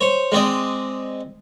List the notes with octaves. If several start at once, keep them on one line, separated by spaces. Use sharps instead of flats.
C5 C#5
G#3 C4 D5 D#5